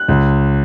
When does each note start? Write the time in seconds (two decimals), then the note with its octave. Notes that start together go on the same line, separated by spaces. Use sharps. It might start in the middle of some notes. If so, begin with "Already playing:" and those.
Already playing: F#6
0.08 C#2